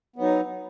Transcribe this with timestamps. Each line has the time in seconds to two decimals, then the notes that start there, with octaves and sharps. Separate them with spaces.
0.16 B3
0.19 F#3
0.21 D#4